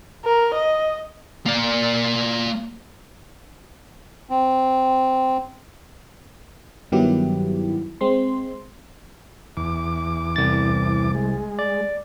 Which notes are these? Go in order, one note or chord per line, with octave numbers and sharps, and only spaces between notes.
A#4
D#5
A#3 D5
C4
G2 D#3 F#3 B3 E4 G4
G#3 C4 C6
E2 D6
C2 A6
G#3
D5